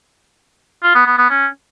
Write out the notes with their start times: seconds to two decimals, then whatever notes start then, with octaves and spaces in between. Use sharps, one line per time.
0.83 F4
0.95 B3
1.06 B3
1.18 B3
1.30 C#4